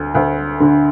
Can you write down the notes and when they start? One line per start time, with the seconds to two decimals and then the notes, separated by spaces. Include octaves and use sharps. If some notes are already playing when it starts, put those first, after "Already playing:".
Already playing: D2
0.15 D2
0.60 D3